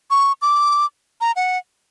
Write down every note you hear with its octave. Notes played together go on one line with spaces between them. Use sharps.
C#6
D6
A#5
F#5